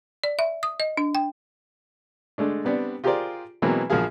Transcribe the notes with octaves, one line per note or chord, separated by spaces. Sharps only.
D5
E5
D#6
D#5
D4
G5
D3 G#3 A3 D4
G3 B3 C4 D4
F4 G4 G#4 A#4 C5 D5
B2 E3 F#3 G#3 A#3 C4
A#1 F3 A#3 F#4 G#4 F5